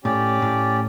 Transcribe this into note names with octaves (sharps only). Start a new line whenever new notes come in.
A2 C#4 G4 D5
A2